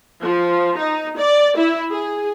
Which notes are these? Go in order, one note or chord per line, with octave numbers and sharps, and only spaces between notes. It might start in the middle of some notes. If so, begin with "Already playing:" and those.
F3
D#4
D5
E4
G#4